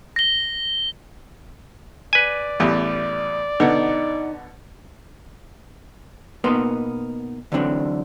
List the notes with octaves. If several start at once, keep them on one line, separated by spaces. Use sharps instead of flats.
A#6 G7
B4 D5 G#5
A1 E2 G3
B2 D3 B3 D#4
B2 A#3 B3 D#4 B4 C6
D3 E3 F#3 C4 D4